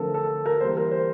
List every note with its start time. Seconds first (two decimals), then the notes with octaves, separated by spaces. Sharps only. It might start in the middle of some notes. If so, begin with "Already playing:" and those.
Already playing: D3 F3 A3 C4 A4 A#4
0.14 A4
0.46 A#4
0.60 E3 G3 A#3 C5
0.77 A#4
0.91 C5